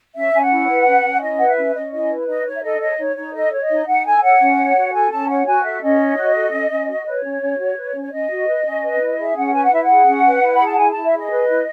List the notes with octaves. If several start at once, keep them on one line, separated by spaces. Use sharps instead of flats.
C#4 E5
C#4 G#5
F#5
E4
B4
C#4
C#4
E4 D#5
B4 F#5
E5
C#4
C#4 D#5
E4 D#5
B4
D#4 D#5
D#4 C#5
E5
A4 D#5
C#5 D#5
D#4 C#5
D#4 C#5
A4 D#5
C#5
D#5
D#4
D#4 F#5
A4 G#5
C#5 F#5
C#4
C#5
F#4
A4 G#5
C#4 A5
C#5 F#5
F#4 G#5
A4 E5
C#4 D#5
C#5
F#4
A4
C#4
C#4
F#4
B4 C#5
C#4
C#4
F#4
B4
C#4
C#5
C#4 D#5
F#4
B4
C#4
B4
E4
G#4 E5
C#4 F#5
B4 G#5
F#5
E4 E5
F#5
G#4
C#4
B4
E4
B5
G#4
A5
E4 G#5
E4 A5
E5
G#4 D#5
B4
E4